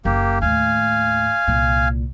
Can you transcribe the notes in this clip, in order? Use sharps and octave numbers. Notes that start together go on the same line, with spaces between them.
F#1 A#3 G4
D#2 A2 F5 G#5
C2 A#2